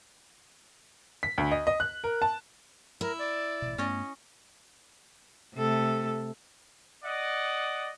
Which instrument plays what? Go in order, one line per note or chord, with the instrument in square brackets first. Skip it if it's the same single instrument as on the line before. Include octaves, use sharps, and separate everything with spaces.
[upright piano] B6
D2
D#5
D#5
F#6
A#4
A5
[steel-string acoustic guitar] E4 [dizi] A#4
[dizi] D5
[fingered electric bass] A1 B2
[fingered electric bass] G2 A3 B3 [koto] C#4 C#5 D#5
[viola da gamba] C3 A3 A4
[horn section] D5 D#5 F#5